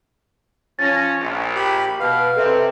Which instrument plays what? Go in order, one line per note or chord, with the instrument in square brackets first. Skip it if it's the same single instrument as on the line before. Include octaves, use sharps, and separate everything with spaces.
[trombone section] F3 C#4 [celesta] A6 A#6
[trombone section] A#1
[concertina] G4 B5
[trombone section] B2 [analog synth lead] B4 [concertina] F5
[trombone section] C3 C4 [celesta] A4 E5